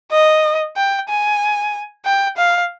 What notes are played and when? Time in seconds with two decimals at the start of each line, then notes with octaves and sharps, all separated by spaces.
0.12 D#5
0.77 G5
1.09 G#5
2.05 G5
2.38 F5